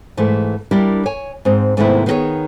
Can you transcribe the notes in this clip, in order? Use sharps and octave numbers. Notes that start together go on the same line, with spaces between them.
G#2 E3 A3
G3 D4 E4 G4 A#4
C#5 G#5
G#2 C4
G#2 C3 D#3 A3 B3 E4
D#3 B3 D4 F#4 G#4 C#5